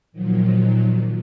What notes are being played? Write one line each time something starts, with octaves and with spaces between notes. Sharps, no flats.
A#2 D#3 F3 F#3